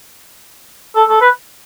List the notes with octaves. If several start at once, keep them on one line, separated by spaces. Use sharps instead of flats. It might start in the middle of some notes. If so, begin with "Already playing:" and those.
A4
A4
B4